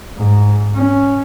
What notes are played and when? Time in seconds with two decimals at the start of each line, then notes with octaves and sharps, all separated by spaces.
0.17 G#2
0.75 C#4